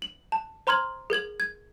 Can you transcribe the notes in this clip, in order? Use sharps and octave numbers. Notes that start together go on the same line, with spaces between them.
F#7
A5
C5 A#5 C6 F6 G#6 F#7
G#4 A#4 G#6 F#7
G#6